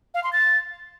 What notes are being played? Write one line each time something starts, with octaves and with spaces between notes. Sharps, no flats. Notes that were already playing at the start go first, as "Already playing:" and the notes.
F5
C6
A6